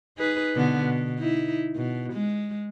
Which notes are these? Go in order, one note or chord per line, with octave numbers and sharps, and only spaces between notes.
D#4 G#4 B4
B2 D3 B3
B2
D#4 E4
B2
G#3